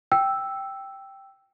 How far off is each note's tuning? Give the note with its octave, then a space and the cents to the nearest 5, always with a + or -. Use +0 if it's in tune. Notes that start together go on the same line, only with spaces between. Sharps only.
G5 +0 E6 +0